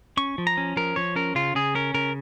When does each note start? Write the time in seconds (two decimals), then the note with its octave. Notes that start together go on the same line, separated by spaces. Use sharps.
0.17 C#4 C#6
0.38 F3
0.47 A#5
0.57 C#4
0.76 F3 A#4
0.96 F3 C#5
1.16 C#4 A#4
1.35 C#3 F4
1.55 C#3 G#4
1.75 C#4 A#4
1.94 C#3 A#4